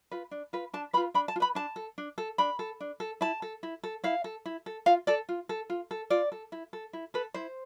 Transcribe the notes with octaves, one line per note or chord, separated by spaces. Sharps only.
F4 B4
D4
F4 B4
D4 A5
F4 B4 B5
D4 B5
A5
F4
B4 B5
D4 A5
A4
D4
A4
D4 B5
A4
D4
A4
E4 A5
A4
E4
A4
E4 F5
A4
E4
A4
F4 F5
A4 D5
F4
A4
F4
A4
F4 D5
A4
E4
A4
E4
A4 B4
E4 C5